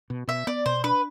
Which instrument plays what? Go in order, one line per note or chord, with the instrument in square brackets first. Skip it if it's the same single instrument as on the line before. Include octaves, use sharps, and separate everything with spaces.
[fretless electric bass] B2
[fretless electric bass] B2 [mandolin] E5
[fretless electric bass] B3 [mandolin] D5
[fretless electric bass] B2 [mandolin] C5
[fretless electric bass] D4 [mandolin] B4